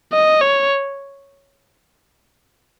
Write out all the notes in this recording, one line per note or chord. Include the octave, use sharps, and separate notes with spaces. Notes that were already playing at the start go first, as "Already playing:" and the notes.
D#5
C#5